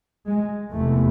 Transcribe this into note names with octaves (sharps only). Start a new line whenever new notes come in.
G#3
F1 E2 C3 A3